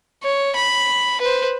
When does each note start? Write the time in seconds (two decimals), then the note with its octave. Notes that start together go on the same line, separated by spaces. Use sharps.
0.23 C#5
0.55 B5
1.21 B4 C5